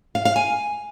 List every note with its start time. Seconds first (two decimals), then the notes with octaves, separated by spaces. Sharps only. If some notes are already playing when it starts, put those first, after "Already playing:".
0.15 F5
0.25 F5
0.36 G#5